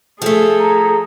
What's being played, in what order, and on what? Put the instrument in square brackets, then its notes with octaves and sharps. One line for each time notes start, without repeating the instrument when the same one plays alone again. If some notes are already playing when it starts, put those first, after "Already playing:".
[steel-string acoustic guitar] F3 A3 [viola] G#4 A4
[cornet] A#5